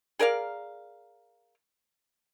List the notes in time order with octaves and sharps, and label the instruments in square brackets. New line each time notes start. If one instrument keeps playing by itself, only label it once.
[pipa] G#4 A#4 D5 F5